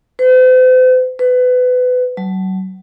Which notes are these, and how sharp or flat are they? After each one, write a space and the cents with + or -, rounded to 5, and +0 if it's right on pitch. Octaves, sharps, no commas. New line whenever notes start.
C5 -45
B4 +25
F#3 +30